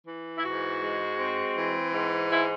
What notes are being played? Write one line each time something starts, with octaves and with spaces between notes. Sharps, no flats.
E3
E4
G#2 F#4
G#3
C4
E3
G#2
G#3 E4